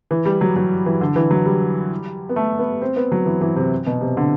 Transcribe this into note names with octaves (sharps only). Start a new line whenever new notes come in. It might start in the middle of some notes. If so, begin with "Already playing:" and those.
E3
G3
F#3
F#3
E3
D3
E3
F#3
G3
B3
A3
B3
C4
B3
F#3
E3
E3
C3
B2
C3
D3